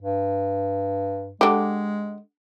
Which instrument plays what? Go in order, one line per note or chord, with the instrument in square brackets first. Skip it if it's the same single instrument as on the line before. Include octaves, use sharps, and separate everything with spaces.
[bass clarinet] G2
[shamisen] D3 G4 [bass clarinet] G#3